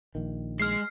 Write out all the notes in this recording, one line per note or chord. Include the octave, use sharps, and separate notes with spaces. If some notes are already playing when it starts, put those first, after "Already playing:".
A#1 D#3
G#3 F6 C7